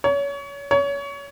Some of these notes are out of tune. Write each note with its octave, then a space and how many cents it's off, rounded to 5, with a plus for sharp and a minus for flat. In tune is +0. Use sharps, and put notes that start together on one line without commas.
C#5 +30
C#5 +25